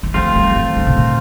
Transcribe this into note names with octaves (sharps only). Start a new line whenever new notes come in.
E3
F3 A3 C4 F4
G3
E3
D3
C3
A#2